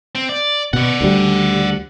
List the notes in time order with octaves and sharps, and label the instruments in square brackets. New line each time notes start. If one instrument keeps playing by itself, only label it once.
[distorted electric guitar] C4
D5
[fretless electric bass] B2 [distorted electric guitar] D5 F#5
[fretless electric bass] D2 G3